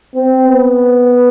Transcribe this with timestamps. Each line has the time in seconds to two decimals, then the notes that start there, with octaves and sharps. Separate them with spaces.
0.15 C4
0.48 B3